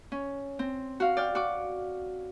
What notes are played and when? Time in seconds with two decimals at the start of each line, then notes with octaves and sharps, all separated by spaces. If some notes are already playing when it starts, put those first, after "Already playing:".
0.12 C#4
0.59 C4
1.00 F#4 F5
1.17 D5 G5 F6
1.35 F#4 D6